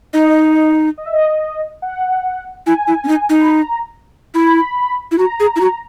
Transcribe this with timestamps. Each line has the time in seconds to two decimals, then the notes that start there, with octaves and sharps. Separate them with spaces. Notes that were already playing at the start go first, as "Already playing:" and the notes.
0.13 D#4 D#5
0.98 D#5
1.05 E5
1.13 D#5
1.82 F#5
2.67 E4 G#5
2.87 E4
3.04 C#4
3.08 D#4
3.29 D#4
3.41 B5
3.50 A#5
4.34 E4 B5
5.12 E4
5.18 F#4 A#5
5.40 G#4
5.56 E4
5.61 F#4